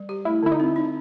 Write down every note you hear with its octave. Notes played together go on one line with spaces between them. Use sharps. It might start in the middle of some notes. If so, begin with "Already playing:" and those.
Already playing: G3
G4
A3 E4
D3 E4
D#4
C4
D#4